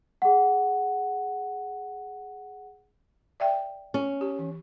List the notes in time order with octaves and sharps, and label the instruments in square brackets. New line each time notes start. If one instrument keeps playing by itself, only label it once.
[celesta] G#4 F#5
[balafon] D5 E5 G5
[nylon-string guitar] C#4
[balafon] G4
E3